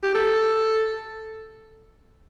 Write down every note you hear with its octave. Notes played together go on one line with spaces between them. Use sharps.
G4
A4